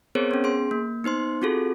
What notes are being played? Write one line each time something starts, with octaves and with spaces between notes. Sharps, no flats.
B3 C4 G#4 A#4 C5 C#5
B3 C#4
G#4 C6
A#3
B3 D#4 C5 C6
C4 F4 F#4 G#4 A4